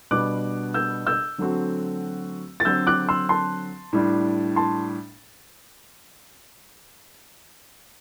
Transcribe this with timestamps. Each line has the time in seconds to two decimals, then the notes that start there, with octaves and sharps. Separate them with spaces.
0.11 B2 G3 B3 D4 D6 F#6
0.74 E6 G6
1.07 E6 G6
1.38 D3 F#3 A3 C4 F#4
2.60 A6
2.65 D3 F#3 C4 E6 G6
2.87 D6 F#6
3.09 C6 E6
3.29 A5 C6
3.93 A2 G3 D4
4.56 A5 C6